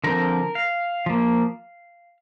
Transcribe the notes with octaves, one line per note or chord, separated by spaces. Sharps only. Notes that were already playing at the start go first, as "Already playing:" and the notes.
D3 F3 C4 A#4
F5
F3 A#3